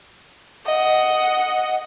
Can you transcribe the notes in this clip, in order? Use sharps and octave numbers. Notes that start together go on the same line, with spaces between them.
D#5 F#5